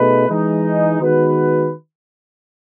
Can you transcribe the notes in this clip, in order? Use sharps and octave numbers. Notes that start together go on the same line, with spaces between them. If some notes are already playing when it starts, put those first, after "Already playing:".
Already playing: B2 A3 D#4 G#4 B4
E3 G#3 D#4
D#3 G#3 B3 F#4 B4